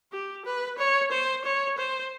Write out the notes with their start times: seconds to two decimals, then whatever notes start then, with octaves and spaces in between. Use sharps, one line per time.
0.12 G4
0.45 B4
0.78 C#5
1.11 C5
1.45 C#5
1.78 C5